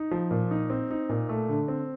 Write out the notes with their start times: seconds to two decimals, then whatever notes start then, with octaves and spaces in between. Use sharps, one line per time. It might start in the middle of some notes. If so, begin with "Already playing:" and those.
Already playing: D#4
0.11 F3
0.31 A#2
0.51 D#4
0.70 C4
0.91 D#4
1.09 A#2
1.29 A3
1.49 D3
1.68 C4